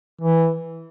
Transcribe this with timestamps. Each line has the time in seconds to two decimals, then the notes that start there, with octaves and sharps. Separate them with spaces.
0.21 E3